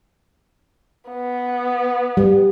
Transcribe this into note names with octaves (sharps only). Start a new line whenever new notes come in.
B3
G3